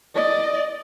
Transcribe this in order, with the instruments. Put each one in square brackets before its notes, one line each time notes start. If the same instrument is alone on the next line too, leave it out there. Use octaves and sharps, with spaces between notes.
[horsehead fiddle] D5 D#5